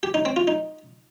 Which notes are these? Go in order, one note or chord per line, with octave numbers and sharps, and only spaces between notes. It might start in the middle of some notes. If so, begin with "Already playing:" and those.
G4
D#4
C4
F4
D#4